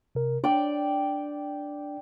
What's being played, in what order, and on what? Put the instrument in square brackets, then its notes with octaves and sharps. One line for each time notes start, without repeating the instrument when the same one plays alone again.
[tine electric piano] C3 A#4
[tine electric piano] D4 [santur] D5 G5